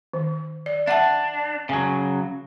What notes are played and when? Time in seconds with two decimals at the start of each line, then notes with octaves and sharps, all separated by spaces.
0.13 D#3
0.66 D5
0.87 D4 E5 F#5 A5
1.69 C#3 F#3